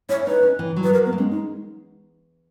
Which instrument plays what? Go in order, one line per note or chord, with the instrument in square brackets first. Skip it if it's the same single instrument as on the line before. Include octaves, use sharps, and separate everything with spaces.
[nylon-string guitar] E4 [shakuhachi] C#5
[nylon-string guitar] D#4 [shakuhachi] B4
[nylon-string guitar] C#4
E3
F#3
[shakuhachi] B4
[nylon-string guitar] F#3 [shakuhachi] A#4
[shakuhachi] B3
[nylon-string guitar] A#3
[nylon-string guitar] G#3 [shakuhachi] C#4
[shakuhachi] D#4